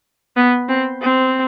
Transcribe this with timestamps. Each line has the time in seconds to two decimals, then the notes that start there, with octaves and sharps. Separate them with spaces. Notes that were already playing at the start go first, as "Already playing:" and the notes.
0.36 B3
0.69 C4
1.02 C4